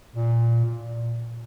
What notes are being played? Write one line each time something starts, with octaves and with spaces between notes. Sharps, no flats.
A#2
A#2